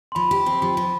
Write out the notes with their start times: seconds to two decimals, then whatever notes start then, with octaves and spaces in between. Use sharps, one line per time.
0.12 C6
0.15 F3 B5
0.31 G4
0.46 C4
0.62 F3
0.77 F3